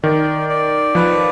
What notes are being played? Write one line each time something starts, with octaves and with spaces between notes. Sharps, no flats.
D#3 D5
D5
F3 B4